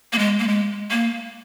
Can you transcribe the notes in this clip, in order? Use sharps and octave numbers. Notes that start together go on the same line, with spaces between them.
A#3
G#3
A#3
G#3
A#3